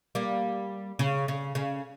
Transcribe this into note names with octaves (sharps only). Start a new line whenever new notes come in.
G3 A#3
C#3
C#3
C#3